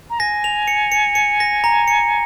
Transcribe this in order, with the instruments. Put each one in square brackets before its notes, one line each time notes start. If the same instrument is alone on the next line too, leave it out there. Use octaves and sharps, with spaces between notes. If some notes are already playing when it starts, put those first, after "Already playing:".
[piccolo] A#5
[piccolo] G#5 [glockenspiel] A#6
[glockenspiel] F7
C#7
C#7
C#7
A#6
A#5
C#7